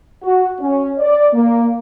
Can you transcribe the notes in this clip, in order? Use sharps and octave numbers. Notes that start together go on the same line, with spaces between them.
F#4
C#4
D5
A#3